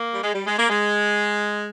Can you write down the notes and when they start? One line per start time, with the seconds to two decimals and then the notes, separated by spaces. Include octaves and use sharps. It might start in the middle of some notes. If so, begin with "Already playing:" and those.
Already playing: A#3
0.14 G3
0.23 G#3
0.34 G3
0.46 G#3
0.58 A#3
0.69 G#3